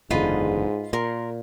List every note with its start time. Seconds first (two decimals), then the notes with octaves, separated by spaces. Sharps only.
0.10 F#1 E2 G#2 D3 F4 B4 D#5
0.93 A#2 A#4 C6